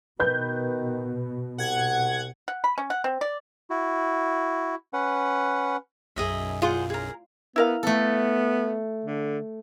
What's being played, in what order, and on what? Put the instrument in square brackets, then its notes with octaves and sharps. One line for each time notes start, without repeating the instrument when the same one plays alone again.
[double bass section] B2 [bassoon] D#3 [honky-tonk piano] B4 G6
[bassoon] C2 [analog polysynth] F#5 G#6
[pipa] F#5
B5
C#4
F#5
C4
D5
[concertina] E4 F#4
C#4 B4 F#5
[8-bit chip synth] B1 F#2 [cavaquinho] G#4 D#5 E5
[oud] F4 [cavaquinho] G#4 C5 F#5
[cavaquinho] G#4 A#4
[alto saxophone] B3 [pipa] E4 A#4 F5
[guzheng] A3 A4 [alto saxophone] B3
[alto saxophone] D3